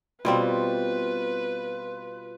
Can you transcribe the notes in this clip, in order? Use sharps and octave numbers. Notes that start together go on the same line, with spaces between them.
B2 G3 C4 F4 B4